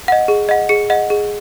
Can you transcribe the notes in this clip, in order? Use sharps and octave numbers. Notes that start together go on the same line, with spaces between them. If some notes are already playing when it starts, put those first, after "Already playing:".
D#5 F#5
G#4
D#5 F#5
G#4 C#7
D#5 F#5
G#4